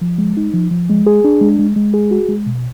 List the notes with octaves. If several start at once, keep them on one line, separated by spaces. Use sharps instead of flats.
F3
G#3
D#4
F3
F3
G#3
G#4
D4
G#3
G#3
G#3
G#4
F#4
G#3
B2